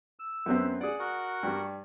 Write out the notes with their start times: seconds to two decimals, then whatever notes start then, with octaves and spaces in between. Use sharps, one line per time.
0.19 E6
0.46 F#2 B3 C4
0.81 G#4 D5 F#5
0.99 F#4 A#4 F#5
1.43 G2 G3